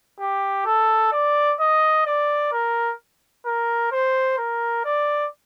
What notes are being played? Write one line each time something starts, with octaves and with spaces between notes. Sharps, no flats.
G4
A4
D5
D#5
D5
A#4
A#4
C5
A#4
D5